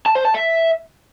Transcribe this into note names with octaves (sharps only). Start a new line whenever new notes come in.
A5
C5
A5
E5